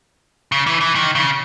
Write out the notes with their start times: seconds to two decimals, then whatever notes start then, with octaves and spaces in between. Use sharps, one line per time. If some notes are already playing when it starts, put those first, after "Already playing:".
0.52 C#3
0.66 E3
0.81 E3
0.95 D#3
1.15 C#3